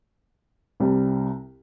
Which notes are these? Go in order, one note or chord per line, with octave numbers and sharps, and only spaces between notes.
C2 C3 G3